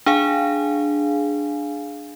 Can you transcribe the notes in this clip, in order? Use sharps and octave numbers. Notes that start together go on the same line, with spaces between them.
D4 G#4 F5 G#5